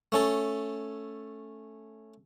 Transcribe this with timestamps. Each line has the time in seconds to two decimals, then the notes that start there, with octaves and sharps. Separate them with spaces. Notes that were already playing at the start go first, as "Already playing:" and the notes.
0.12 A3 C#4 A4